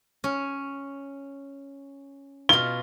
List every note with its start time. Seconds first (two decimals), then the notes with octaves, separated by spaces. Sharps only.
0.24 C#4
2.49 B2 F4 G7